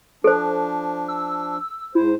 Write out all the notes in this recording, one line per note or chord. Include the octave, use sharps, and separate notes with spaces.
F3 D4 A4 C5
E6
G#2 E4 C5